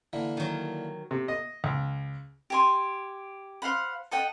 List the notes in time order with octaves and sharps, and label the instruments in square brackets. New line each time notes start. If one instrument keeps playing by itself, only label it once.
[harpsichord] D3 E3 A#3
[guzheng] D#3 F#3
[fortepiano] C3
D#5
C#2
[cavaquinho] G4 G#5 C6
C5 F5 F#5 B5
A4 D#5 F#5 G5